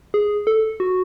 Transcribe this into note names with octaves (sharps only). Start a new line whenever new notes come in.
G#4
A4
F#4